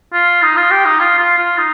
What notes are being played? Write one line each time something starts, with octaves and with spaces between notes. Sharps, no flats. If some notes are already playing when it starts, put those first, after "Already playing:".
F4
D#4
F4
G4
D#4
F4
F4
F4
D#4